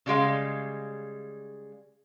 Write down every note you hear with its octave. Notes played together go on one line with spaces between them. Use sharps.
C#3 G3 G#3 F5